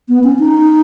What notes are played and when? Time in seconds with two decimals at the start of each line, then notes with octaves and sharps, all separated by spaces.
0.09 B3
0.24 C#4
0.39 D#4